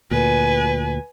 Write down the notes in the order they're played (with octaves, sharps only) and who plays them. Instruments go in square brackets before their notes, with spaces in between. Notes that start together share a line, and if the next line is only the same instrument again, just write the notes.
[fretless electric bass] D2 A#2 [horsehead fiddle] B4 G#5